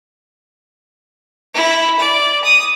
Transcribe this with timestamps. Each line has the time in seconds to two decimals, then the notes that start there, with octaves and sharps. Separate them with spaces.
1.54 E4
1.99 D5
2.44 D#6